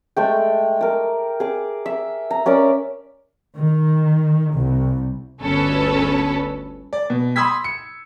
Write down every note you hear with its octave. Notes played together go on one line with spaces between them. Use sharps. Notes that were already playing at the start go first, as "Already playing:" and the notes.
G#3 A3 G5
A#4 D6
G#4 D6
E5
A#5
C#4 A#4 D5 E5
D#3
C2
G1 D2 C#4 A4 B4
D5
B2
B5 C6 D#6 E6 G#6 B6
C#7